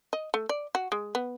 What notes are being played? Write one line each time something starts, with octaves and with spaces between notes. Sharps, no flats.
D#5
A3
D5
F#4
G#3
B3